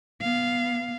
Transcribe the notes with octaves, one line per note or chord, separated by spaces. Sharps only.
B3 F5